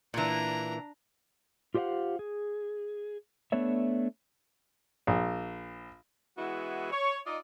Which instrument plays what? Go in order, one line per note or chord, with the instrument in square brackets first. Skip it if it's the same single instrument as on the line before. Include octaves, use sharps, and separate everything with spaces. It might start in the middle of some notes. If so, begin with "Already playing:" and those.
[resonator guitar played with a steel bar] A#2 E3 [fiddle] D4 A#5
[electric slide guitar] F4 G4 C5 D#5 F5 F#5
G#4
A3 B3 D4 C#5 E5
[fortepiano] A#1
[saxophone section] E3 G#3 B3 E4 F#4
C#5
D#4 F4 D5 D#5